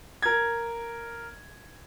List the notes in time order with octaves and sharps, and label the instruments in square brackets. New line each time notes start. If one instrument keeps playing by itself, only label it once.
[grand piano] A#4 G#6